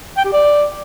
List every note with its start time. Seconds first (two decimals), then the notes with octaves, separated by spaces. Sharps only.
0.17 G5
0.25 G4
0.32 D5